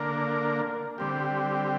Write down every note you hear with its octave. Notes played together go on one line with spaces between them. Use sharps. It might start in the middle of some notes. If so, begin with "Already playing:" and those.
Already playing: D3 A#3 D4 A#4
D3 G3 C4 G4